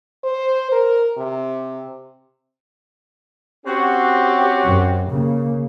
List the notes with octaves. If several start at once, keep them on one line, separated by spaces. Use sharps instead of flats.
C5
A#4
C3
C4 C#4 F#4 G4
F#2
C#3 A#3